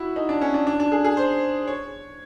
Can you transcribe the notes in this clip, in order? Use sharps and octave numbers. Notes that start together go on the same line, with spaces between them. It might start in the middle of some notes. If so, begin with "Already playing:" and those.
Already playing: E4 F#4
D#4
D4
C#4
D4
D4
D4
G#4
G#4
C5
C#5